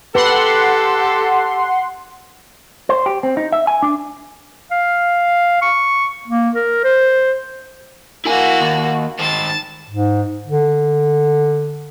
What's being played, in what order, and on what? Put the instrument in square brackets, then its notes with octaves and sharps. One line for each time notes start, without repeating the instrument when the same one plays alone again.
[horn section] G4 A4 [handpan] B4 [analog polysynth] F#5 C6
[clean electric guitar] C5
G4
C4
D#4
E5
G#5
D4
[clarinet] F5
C#6
A#3
A#4
C5
[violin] A#3 F#4 [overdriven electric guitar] E4 G#5
[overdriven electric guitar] D#2
[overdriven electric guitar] D#3 C5 [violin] A5
[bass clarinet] G#2
D3